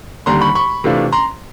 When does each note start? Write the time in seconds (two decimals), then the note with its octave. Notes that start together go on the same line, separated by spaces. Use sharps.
0.26 D#2 D3 G3 A#5 C6
0.41 B5 C#6
0.55 B5 C#6
0.84 C3 E3 A3 D4 F4
1.12 A#5 C6